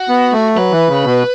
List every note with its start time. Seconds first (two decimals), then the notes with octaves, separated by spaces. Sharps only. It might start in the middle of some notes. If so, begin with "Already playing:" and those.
Already playing: F#4
0.09 B3
0.32 A3
0.56 F#3 B4
0.72 E3
0.88 C#3
1.04 B2